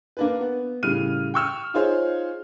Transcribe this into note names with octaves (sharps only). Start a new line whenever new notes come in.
A#3 D4 B4
B3
A2 C#3 G3 F6 D#7
G5 C#6 E6 F6
D#4 F4 G#4 C5 C#5 F5